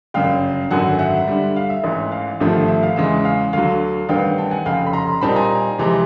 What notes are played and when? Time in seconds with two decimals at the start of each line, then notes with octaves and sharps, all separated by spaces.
0.14 G1 F#2 C#3 F5 G5
0.71 G#1 F#2 D3 F#3 F#5 G#5
0.99 E5 F#5
1.27 G2 D3 G3
1.56 F5
1.70 E5
1.84 A1 G#2 E3
2.12 F5
2.40 G#1 G2 D3 F3 A3
2.68 E5
2.83 F5
2.96 E2 C#3 E3 G#3 E5
3.25 F5
3.53 D2 D3 F#3 F5
4.09 A1 G2 D#3 G3 B3 F5 G5
4.38 G5 A5
4.51 F#5 G#5
4.65 F1 F2 C#3 F5 G5
4.86 B5
4.93 A#5 C6
5.21 A#2 G3 C4 D#4 A5 B5
5.36 G#5 A#5
5.78 F2 C3 E3 G#3